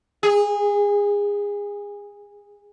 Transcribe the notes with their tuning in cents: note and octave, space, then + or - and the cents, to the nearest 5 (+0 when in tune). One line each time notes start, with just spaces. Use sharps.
G#4 -25